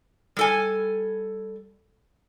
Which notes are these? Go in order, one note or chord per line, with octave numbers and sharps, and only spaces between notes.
G3 A4 G#5